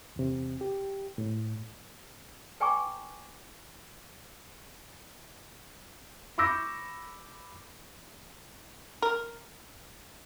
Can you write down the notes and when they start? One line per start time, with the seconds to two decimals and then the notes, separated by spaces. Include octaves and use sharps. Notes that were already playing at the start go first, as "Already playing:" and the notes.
0.16 E2 C3
0.61 G4
1.18 A2
2.60 B4 G5 G#5 A#5 C#6 D6
6.38 B5 C#6 D6 E6 G6 A#6
9.02 A#4